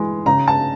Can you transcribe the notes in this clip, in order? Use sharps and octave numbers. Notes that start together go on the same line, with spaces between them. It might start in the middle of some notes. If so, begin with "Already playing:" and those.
Already playing: E3 G#3
C#3 A#5
A5